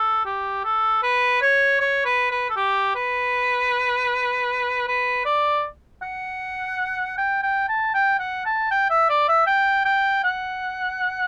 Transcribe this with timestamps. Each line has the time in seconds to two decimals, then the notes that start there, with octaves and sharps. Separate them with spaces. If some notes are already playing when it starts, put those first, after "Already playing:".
Already playing: A4
0.25 G4
0.64 A4
1.03 B4
1.42 C#5
1.80 C#5
2.05 B4
2.31 B4
2.50 A4
2.56 G4
2.95 B4
4.87 B4
5.25 D5
6.02 F#5
7.17 G5
7.43 G5
7.69 A5
7.94 G5
8.19 F#5
8.45 A5
8.71 G5
8.90 E5
9.09 D5
9.28 E5
9.47 G5
9.85 G5
10.24 F#5